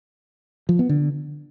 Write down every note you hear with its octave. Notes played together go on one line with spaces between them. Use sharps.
F3
B3
D3